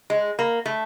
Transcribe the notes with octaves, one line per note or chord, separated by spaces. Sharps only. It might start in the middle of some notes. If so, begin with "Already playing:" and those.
G#3
A#3
A3